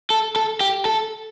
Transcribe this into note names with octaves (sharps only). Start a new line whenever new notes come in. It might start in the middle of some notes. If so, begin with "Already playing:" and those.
A4
A4
G4
A4